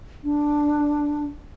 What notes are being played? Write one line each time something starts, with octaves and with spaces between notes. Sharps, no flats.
D4